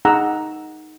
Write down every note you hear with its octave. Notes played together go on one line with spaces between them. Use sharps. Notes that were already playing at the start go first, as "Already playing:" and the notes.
D#4 G#4 F#5 A#5 E6